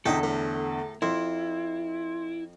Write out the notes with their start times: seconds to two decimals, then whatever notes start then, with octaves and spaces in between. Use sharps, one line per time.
0.06 E2 D3 D#4 E4 A4 G5
0.23 A2
1.02 F2 E4 C6